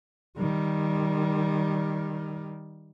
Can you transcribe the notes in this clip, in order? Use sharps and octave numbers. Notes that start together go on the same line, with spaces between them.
D#3 G3